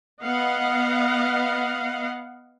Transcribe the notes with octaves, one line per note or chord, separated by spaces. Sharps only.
B3 D#5 F5 F#5